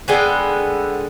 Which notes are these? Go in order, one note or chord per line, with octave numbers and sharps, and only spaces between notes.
D3 G#3 B3 G5